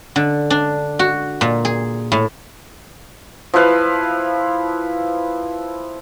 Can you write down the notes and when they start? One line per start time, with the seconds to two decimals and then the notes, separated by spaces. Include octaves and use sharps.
0.16 D3
0.50 D4
0.99 F#4
1.41 A#2
1.65 G#4
2.12 A2
3.54 F3 E4 B4 F5